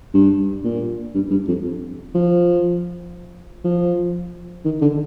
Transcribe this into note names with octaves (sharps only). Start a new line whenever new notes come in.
G2
A#2
G2
G2
F2
F3
F3
D#3
D3